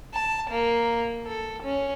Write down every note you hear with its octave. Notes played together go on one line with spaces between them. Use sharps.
A5
A#3
A4
C#4